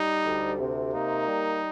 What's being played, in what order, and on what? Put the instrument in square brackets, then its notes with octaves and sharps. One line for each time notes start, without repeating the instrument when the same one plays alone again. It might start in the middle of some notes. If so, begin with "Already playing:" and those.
Already playing: [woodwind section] G3 [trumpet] D#4
[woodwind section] D2
C3
[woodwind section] A#3 [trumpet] D#4
[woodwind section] G3